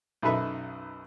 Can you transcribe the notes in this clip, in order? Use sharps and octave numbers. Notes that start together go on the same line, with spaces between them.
B1 F#2 D#4 A4 B4 E5